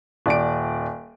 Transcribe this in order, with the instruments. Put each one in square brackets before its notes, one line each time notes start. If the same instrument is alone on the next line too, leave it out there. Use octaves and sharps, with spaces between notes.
[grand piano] D#1 D5 D7